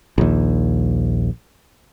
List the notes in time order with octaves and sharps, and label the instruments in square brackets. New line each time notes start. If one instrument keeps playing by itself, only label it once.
[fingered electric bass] A#1 D#2